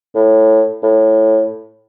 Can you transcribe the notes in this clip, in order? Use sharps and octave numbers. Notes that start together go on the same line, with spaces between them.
A2
A2